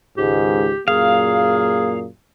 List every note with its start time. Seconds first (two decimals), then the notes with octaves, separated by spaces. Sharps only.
0.17 C#2 G#2 D#3 G4
0.88 F#2 A#2 A#3 G#4 F5